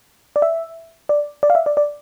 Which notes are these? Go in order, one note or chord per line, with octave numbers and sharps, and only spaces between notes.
D5
E5
D5
D5
F5
E5
D5
D5